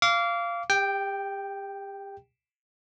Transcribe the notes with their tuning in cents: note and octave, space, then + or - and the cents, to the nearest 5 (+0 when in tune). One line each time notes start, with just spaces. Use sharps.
F5 -15 D6 -30
G4 +35 G5 +0